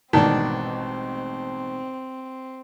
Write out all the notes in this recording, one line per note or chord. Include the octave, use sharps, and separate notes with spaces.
A1 G#2 B2 D#3 C4 D4 A5